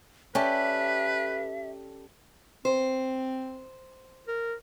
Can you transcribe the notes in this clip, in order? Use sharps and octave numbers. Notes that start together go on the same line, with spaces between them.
C#4 G4 A4 B4 D5 E5
C4 C5
A#4